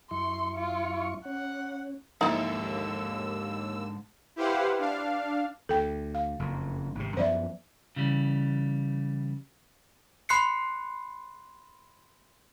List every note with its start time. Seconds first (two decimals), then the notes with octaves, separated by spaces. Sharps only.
0.11 F#2 E4 C6 C#6
0.56 F4
1.25 C#4 F#5
2.21 A#1 D#2 G#2 D3 D#4 E4 E6
4.36 E4 G4 B4 C5 F5 F#5
4.79 D4 F5
5.69 D2 A4 G5
6.15 F5
6.39 F#1 F2
6.95 G#1 C3
7.17 F#2 F3 B3 C5 D5 E5
7.96 C#3 E3 G3
10.29 B5 C6 F#6 C7 C#7